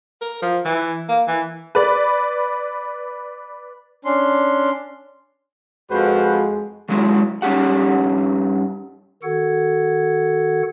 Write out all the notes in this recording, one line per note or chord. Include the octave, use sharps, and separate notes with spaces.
A#4
F3
E3
A#3
E3
B4 D5
C#4 D4 C6
F2 G#3 F#4 B4 C5
D#3 F#3 G#3 C#4 E4
G2 C#4 D#4 G4 F#5
D#3 F#4 A4 F#5 G#6